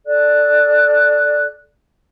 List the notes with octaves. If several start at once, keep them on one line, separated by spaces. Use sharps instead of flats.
A4 D5 F#6